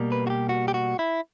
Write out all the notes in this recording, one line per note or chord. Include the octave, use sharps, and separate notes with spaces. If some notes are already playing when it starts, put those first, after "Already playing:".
Already playing: B2 G3 A#3
B4
F#4
G4
F#4
G4
F#4
E4